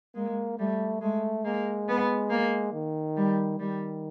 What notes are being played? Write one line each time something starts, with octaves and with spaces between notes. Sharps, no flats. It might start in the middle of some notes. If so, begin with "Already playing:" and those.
G#3 A#3
G3 A3
G#3 A3
G#3 A#3
B3
A#3
D#3
G3
D#3 G3